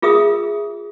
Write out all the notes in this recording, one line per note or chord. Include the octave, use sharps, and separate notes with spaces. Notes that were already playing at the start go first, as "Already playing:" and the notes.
F4 G#4 A#4 E5 D#6